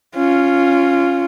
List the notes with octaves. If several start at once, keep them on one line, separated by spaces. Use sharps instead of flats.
C#4 F4